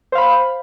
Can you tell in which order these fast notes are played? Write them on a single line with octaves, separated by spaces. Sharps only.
C5 F5 B5